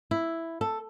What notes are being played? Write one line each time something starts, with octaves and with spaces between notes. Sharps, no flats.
E4
A4